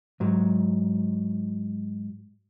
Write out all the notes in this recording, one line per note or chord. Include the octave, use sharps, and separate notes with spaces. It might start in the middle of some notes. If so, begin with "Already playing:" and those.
G#2 F#3